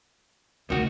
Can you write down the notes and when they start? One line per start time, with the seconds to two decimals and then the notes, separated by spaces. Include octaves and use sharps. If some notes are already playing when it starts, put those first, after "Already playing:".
0.70 D2 C3 D#3 F#4